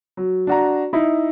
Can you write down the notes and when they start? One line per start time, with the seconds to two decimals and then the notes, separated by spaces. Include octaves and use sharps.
0.17 F#3
0.47 D4 F#4 A#5
0.93 D#4 E4